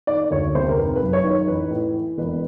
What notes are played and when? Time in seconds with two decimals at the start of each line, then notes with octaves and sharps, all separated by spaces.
0.07 D#3 D5
0.31 D2 C#5
0.55 C3 C5
0.69 A#4
0.77 G#1 B4
0.96 B4
1.02 F#2
1.13 C#5
1.24 D#3
1.30 C#5
1.48 A1 B4
1.71 A2
1.94 E3
2.18 E1 B4